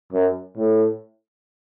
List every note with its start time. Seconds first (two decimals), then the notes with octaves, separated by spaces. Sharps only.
0.13 F#2
0.57 A2